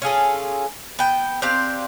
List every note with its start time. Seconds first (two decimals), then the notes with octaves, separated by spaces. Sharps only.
0.02 C#4 F4 G#4 A4
0.99 B3 G5
1.42 C4 D4 G4 F5